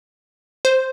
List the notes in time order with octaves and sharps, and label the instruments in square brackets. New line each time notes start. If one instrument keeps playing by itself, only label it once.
[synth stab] C5